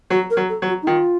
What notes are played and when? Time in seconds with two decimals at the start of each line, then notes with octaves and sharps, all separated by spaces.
0.10 F#3 F#4
0.30 A#4
0.37 F#3
0.49 A4
0.62 F#3
0.68 F#4
0.82 D#4
0.87 D#3 F4